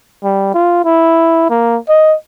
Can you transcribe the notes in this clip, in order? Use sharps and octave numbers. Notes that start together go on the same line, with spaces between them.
G3
F4
E4
A#3
D#5